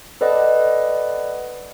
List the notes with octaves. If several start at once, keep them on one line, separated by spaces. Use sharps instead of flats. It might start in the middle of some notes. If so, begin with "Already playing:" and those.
A4 B4 D5 D#5 F#5